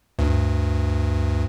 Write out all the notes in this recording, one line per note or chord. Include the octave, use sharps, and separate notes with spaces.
D2 G2